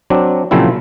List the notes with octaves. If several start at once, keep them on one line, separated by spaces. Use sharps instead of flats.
F#3 C4 D4
A#2 C#3 F3 F#3 C4 E4